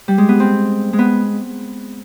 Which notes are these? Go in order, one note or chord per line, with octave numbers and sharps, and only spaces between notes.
G3
G#3
B3
C4
G#3
B3